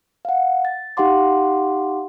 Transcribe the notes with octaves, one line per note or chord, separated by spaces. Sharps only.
F5 F#5
A6
D#4 G4 F5 F#5 C6 D6